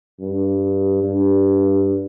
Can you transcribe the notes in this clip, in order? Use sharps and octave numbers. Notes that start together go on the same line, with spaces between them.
G2
G2